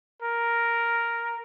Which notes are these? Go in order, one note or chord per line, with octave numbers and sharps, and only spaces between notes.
A#4